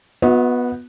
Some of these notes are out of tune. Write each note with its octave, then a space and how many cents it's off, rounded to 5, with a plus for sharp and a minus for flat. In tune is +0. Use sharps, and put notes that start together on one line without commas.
B3 -5 F#4 -40 D#5 +40